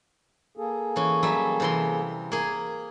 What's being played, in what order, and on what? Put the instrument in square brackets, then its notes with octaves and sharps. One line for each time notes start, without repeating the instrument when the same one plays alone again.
[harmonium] A#3 G#4 A4
[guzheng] E3 C#4
F#3 G3 E5
C3 E3 C6
A#3 G#4